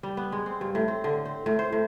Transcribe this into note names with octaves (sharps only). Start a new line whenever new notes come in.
G3
B3
G#3
C4
G2
A2
C4
D3
C4
A2
C5
A2